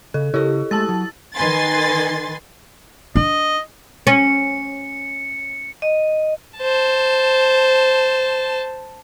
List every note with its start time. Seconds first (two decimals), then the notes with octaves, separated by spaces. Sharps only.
0.14 C#3 A4
0.34 C#3 E4 G4 A4 D#5
0.71 G#3 A3 A5 E6 A6
0.89 F#3
1.35 D#3 B4 G#5 C6 A6
3.15 D4 D#5
4.07 C#4 C#7
5.82 D#5
6.58 C5 A5